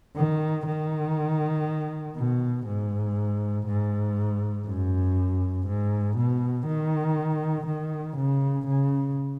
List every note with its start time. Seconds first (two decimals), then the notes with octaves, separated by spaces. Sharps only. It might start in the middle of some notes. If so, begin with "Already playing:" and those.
0.16 D#3
0.67 D#3
2.16 B2
2.66 G#2
3.67 G#2
4.67 F#2
5.67 G#2
6.17 B2
6.67 D#3
7.67 D#3
8.17 C#3
8.67 C#3